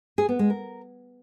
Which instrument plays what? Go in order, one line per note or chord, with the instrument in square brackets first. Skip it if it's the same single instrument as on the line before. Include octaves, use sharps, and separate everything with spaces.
[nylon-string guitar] G#4
B3
G#3
A#4